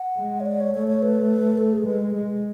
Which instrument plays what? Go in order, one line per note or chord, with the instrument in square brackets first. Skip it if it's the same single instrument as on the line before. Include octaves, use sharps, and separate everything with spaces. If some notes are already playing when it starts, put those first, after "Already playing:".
Already playing: [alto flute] F#5
[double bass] G#3
[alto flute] C#5
D5
C#5
[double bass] A3 [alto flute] C#5
[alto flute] C#5
B4
A4
G#4
[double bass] G#3 [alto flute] B4
[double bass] G#3